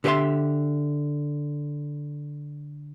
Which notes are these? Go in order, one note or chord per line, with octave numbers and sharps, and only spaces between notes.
D3 G4 B4 C5 E5 C6